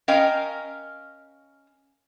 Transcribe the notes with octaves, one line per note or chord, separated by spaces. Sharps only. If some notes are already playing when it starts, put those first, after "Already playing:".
C#4 A#4 D#5 F5 G5 A#5